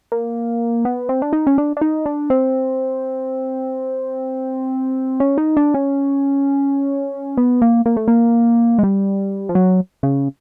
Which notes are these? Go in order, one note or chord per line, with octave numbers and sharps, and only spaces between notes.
A#3
B3
C4
D4
D#4
C#4
D4
D4
D#4
D4
C4
C#4
D#4
D4
C#4
B3
A#3
A#3
A3
A#3
G#3
G3
F3
F#3
C#3